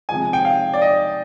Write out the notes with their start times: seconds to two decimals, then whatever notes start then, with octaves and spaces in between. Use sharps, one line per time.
0.09 C3 F3 G#3 G#5
0.33 G5
0.45 F5
0.74 D5
0.82 D#5